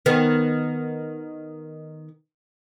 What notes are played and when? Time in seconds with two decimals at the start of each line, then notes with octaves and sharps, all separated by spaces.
0.06 D#3 B3